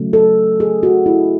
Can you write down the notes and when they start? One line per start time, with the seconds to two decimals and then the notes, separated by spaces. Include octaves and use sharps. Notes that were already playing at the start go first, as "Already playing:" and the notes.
Already playing: C#3 F#3 A3
0.13 A4
0.60 G#4
0.83 F#4
1.06 E4